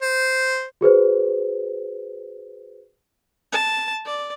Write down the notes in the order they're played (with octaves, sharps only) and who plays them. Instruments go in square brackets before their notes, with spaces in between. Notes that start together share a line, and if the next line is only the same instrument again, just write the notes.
[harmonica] C5
[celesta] F#4 G#4 B4 C5
[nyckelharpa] A5
D5